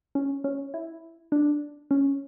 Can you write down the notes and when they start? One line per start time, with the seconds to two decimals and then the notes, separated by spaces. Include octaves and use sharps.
0.15 C#4
0.44 C#4
0.74 E4
1.32 D4
1.91 C#4